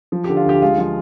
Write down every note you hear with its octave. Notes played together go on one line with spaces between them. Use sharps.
F3
D3 G4
F4
D2 G4
G#3 F4
F3 F4